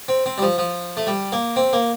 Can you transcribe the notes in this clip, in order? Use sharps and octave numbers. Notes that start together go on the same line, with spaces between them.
C4
C4
G3
F3
F3
A3
G3
A#3
C4
A#3